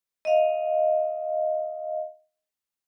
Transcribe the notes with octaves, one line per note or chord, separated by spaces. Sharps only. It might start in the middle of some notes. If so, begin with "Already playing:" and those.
D#5 F5